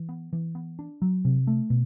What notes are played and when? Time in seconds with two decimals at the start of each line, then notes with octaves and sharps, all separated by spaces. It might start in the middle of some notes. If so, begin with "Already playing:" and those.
Already playing: E3
0.09 B3
0.33 E3
0.55 B3
0.79 D4
1.02 F#3
1.25 C3
1.47 A3
1.70 B2